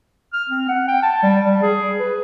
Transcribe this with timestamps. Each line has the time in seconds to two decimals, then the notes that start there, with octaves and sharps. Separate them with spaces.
0.33 F6
0.49 C4
0.69 F#5
0.88 G5
1.03 A5
1.23 G3
1.45 G3
1.62 G#4
2.00 B4